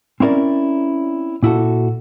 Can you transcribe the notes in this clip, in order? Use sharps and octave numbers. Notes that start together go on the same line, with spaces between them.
C4 C#4 E4 A#4 D5
A#2 E4 F#4 A4